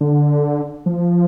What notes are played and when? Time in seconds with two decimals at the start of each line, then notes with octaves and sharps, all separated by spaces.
0.01 D3
0.86 F3